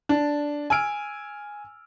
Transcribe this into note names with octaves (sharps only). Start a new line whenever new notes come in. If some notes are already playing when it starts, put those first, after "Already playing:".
D4
G#5 E6 F6 D7